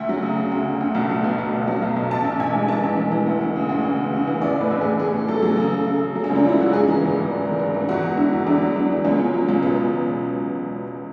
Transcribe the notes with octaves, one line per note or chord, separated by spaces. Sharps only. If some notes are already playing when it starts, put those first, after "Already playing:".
Already playing: D2 E5
F#3
C#3
D2
D2
D2
D2
B1
B2
B1
B1
B2
F#3
B1
B1
A1 A5
A1
A1 G#5
G#2
E3 A5
A1
E3
E3
D2
E3
C#3
D2
D2
D2
C#3
E3
A1 D5
A2
B4
A1
A1 G#4
A2 G#4
A2
F#3 A4
F#3 G#4
C#3 A4
F#3
C#3
C#3
F#3
C#4
C#2
D4
F#3 E4
C#3 F#4
G#2 G#4
E3
G#1
G#1
G#1
G#1
G#1
G#2
E2 F#4
E2
D3 E4
E2
E2 D4
F#3
F#3 D4
E2
C#2 C#4
C#2
F#3
C#2
B2 B3